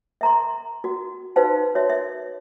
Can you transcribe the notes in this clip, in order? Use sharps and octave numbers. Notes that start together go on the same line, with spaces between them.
E5 A#5 C6
F#4
D#4 F#4 B4 C5 F5 A5
F#4 C#5 E5
E5